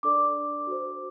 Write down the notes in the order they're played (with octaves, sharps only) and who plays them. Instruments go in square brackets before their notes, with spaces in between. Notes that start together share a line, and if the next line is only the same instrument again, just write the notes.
[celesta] D4 A4 D5 D6
F#4 A4 C5